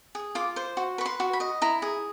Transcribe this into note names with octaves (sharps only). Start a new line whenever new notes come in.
G#4
F4 D6
C5
F#4
B4 C#6
C6
F#4
B5
D#5
E4 A#5
G#4